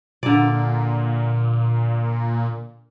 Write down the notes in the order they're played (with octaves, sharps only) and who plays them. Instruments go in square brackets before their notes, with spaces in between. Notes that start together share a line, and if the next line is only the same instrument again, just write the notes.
[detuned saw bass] A#2 [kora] D3 D5